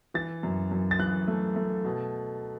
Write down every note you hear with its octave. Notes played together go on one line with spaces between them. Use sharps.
E3 A6
F#2
F#2
A6
E3 F#6
A3
A3
B2